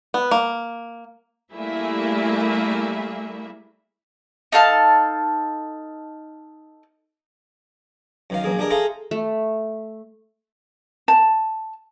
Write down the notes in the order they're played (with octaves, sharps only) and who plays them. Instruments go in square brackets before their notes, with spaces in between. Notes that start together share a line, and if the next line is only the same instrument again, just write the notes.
[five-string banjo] B3
A#3
[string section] G3 A3 A#3 E4 G#4 E5
[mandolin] D#4 A4 F5 A5
[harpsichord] F#2 D#3 F5
A#1 F#2 A#3 G#4
D4 G4 G#4 A#4 D#5
G#4 A4 C5 E5 F5 A#5
[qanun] A3
[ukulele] A5